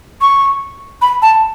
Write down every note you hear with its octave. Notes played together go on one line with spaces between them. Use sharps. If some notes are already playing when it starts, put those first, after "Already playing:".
C#6
B5
A5